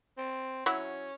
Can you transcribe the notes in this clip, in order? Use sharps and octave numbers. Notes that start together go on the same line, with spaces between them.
C4
F#3 C#4 E4 F#4